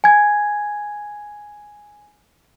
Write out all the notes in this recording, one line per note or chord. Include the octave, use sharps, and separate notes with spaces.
G#5 G#6